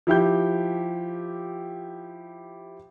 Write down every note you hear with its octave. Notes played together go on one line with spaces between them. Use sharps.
F3 E4 G4 G6